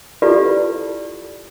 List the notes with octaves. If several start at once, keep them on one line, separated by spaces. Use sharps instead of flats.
E4 F4 G4 A4 B4 D5